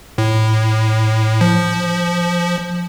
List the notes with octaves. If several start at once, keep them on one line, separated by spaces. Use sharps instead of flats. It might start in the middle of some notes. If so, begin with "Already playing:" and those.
A2
F3